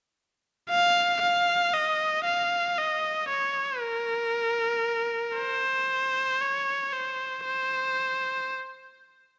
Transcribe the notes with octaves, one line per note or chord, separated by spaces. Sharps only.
F5
F5
D#5
F5
D#5
C#5
A#4
C5
C#5
C5
C5